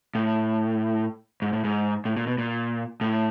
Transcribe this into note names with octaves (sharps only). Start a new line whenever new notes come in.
A2
G#2
A2
G#2
A2
A#2
B2
A#2
A2